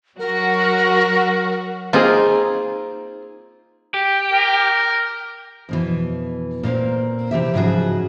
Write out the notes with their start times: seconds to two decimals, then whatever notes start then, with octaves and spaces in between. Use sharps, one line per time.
0.19 F#3 F#4 A#4
1.93 A#3 C4 D#4 F4 G#4
3.94 G4
4.33 A#4
5.69 F2 B2 E3
6.63 A#2 A#3 C4 A#5
7.31 C3 E3 G4 E5
7.54 G#2 C#3 F3 F#3 F#4 G#4